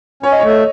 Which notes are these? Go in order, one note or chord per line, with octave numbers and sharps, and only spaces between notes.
C#4 C#5
D#5
A3 C#5